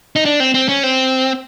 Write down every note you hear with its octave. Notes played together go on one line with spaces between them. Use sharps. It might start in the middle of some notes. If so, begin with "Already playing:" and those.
D#4
D4
C4
C4
C#4
C4